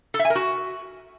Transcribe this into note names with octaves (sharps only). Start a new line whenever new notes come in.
A4
E5
G#5
A#4
F#4